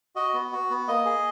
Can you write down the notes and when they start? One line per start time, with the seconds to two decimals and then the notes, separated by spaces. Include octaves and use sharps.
0.16 F#4 D#5
0.34 B3
0.53 F#4
0.70 B3
0.88 A#3 D#5
1.05 G#4